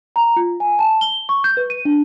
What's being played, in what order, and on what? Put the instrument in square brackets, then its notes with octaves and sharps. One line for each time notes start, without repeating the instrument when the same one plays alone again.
[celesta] A#5
F4
G#5
A5
G7
C#6
G6
B4
D#7
D4